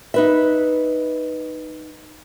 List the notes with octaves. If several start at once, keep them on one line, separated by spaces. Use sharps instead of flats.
D#4 B4 E5